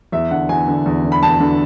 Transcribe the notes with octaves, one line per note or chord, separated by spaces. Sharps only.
E2 E5
D3 F#5
E2 G#5
D3
E2
D3
B5
E2 A5
D3